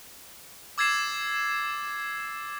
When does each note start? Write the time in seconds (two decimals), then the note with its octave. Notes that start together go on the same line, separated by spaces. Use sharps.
0.78 D6 E6 G#6 A6 C7 E7